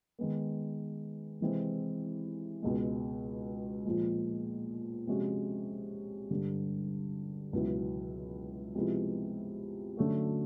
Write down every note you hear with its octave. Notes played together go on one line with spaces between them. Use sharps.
D#3 G#3 B3
C3 E3 G#3 C4
C#2 B2 G#3
A#2 F3 G#3
C3 F3 G#3 C#4 F#4
G2 D3 G3
C#2 B2 F#3 B3 E4
C3 F3 G#3 B3 E4
D3 F#3 A3 C#4 F#4